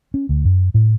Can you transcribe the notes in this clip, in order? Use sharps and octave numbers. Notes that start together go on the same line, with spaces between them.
C#4
D2
F#2
A2